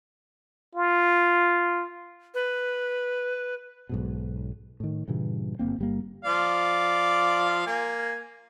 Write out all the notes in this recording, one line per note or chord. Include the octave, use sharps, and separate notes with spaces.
F4
B4
B1 G#2 B2
A2 D#3
G2 A#2 C#3 E3
G1 G2 A#3 C4
G1 G3 A#3
F3 D5 F5
A#3 G#5